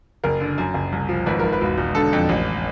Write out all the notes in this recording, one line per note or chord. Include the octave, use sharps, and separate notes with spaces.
F#1 A#4
D3
F#2
F#1
C2
F3
G#1 B4
G#1 A#4
B4
E1
E1
D3 A4
F2
A1